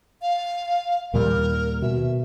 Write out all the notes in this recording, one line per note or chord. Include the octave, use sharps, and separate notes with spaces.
F5
D#2 A#2 G3 A#4
B2 E5